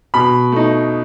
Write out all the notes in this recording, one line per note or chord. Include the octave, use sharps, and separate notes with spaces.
B2 B5
A3 D#4